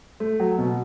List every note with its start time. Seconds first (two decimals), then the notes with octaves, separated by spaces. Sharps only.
0.20 A3
0.40 F#3
0.58 B2